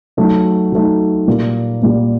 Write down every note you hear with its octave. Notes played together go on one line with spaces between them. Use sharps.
F#3 A3 D#4
F#3 A3 D#4
A#2 G3 A#3
A#2 G3 A#3